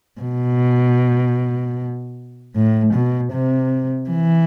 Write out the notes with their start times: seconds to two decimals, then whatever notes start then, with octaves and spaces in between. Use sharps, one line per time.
0.21 B2
2.55 A2
2.94 B2
3.33 C3
4.10 E3